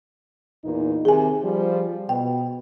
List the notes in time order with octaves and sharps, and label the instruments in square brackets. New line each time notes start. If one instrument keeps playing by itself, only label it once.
[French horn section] E2 A#2 D#4
[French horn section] C3 D#3 [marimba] G#4 G#5
[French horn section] F3 G3
[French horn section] B2 [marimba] G5